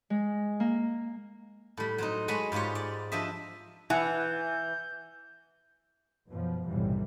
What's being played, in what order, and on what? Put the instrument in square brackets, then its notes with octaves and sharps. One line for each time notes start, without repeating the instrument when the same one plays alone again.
[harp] G#3
A#3
[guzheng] A2 G3
F#3 C4 D#4
G#3 F#4 C#5 G#5 A5 B5
G#2 G3 F4 G4 C#5
D5
F3 D4 G4 D#5 E5
[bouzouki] E3 [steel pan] E4 F#5 [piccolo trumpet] G6
[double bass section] F#2 B2 F3 B3
B1 F#2 A2 C3 E3 G3